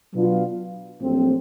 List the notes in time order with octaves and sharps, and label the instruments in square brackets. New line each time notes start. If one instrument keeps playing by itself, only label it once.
[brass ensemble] B2 F#3 B3 D4 F4
A#1 A#2 F#3 A3 C4